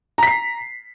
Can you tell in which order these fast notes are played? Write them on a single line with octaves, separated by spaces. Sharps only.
A#5 B6 C7